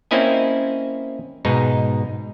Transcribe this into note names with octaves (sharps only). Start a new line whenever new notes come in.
A#3 C4 C#4 E4 D#5 G#5
G#2 B2 D#4